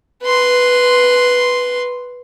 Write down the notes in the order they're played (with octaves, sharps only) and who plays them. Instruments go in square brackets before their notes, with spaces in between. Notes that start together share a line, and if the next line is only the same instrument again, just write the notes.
[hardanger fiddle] B4 C6